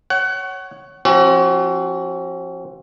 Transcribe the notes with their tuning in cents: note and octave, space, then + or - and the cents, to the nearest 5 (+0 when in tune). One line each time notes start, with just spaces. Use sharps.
C#5 +0 F#5 +25
F3 -10 C4 +45 F#4 +35